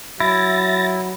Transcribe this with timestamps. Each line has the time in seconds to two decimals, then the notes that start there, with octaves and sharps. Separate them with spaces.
0.20 F#3 E4 A6 A#6